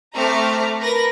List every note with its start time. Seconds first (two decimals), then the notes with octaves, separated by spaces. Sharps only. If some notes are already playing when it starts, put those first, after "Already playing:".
0.13 A3 C4 A#5 D6 F6
0.80 A#4 B4 A#6